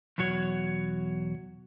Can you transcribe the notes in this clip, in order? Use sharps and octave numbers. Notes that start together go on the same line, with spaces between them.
E2 B2 F#3 F#4 C#5